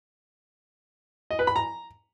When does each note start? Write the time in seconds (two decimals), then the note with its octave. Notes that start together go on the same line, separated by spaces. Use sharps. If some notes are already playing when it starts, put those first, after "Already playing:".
1.31 D#5
1.39 B4
1.47 B5
1.56 A#5